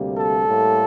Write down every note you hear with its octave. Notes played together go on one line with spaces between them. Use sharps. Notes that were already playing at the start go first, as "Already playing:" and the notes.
Already playing: D2 C3 G3 A#3
A4
A2 G3 A#3